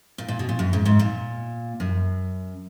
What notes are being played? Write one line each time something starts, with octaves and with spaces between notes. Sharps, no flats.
A#2
A#2
B2
A#2
F#2
G#2
G#2
A#2
F#2